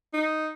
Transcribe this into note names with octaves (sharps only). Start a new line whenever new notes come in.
D#4